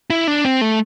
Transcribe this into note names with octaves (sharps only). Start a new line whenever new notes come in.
E4
D4
C4
A3